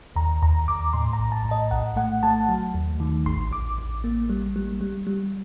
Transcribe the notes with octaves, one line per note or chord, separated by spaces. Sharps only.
D#2 A#5
D#2 A#5
D#2 D6
A2 C6
A#5
A#1
A5
A2
D#5
A#1 F#5
A3 F#5
A3 A5
F#3
D#2
D#3
A1 C6
A1 D6
A1
A#3
G3
G3
G3
G3